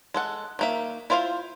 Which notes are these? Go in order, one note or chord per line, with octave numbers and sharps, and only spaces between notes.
G#3 A4 F#5
D#3 A#3 E5
E4 F4 C5 E5 F5